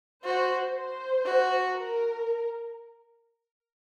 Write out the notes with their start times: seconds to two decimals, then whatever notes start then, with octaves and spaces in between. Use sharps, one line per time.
0.24 F#4 C5
0.75 C5
1.25 F#4
1.75 A#4